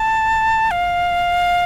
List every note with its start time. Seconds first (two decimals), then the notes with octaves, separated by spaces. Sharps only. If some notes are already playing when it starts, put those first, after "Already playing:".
Already playing: A5
0.71 F5